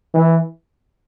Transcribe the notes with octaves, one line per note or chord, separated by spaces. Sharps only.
E3